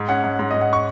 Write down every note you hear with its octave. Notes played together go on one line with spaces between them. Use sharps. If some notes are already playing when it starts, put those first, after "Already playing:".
Already playing: G#2
C#4 F#5
G#2
G#2
D#5
G#2
F#5
C#6